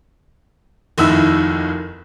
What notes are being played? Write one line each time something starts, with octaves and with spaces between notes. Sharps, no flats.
F1 D#2 D#3 E4 E6